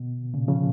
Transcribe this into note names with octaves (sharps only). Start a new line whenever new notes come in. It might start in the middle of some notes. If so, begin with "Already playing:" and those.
Already playing: B2
A#2 C#3
C#3 F3